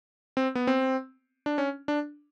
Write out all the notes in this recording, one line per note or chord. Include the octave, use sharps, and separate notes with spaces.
C4
B3
C4
D4
C#4
D4